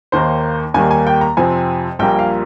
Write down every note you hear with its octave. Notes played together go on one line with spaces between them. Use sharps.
D#2 D#3 A#3 C5
D#2 D#3 G3 A#3 G#5
G#5
G5
A#5
F2 C3 F3 C4 G#5
A#1 A#2 G3 A#3 G5
F5